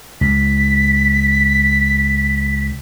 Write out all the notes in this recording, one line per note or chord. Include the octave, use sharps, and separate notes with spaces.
C#2 B6